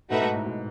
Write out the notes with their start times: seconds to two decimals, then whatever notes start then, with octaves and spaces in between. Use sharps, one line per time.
0.10 B2 A3 D#4 F#4 B4 E5
0.21 G#2
0.34 A2
0.45 B2